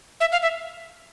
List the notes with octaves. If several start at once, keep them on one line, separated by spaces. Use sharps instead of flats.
E5
F5
E5